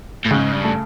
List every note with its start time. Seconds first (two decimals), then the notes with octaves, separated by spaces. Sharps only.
0.25 A2
0.31 G#2 C#3
0.52 G2
0.64 A3